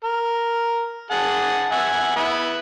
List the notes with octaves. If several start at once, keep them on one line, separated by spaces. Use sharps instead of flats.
A#4
G#4 F#5 A5
E5 F#5 G#5
B3 E4 B4